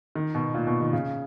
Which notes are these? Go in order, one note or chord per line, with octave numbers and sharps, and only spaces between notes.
D#3
B2
A#2
B2
D#3
C#3